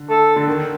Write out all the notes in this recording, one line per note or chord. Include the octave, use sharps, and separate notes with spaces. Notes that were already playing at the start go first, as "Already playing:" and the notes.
Already playing: D3
A4
D3
D#3